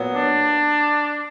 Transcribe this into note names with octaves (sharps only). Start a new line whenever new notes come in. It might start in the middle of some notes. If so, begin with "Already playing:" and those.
Already playing: A#2 F#3 B3
D4